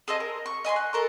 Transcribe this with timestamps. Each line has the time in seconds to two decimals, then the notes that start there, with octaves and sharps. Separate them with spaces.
0.08 G#4 A4 C5 D#5
0.20 A#4
0.46 C#6
0.65 D#5 G#5 B5 C6
0.76 F#5
0.93 A4 A#4 C#6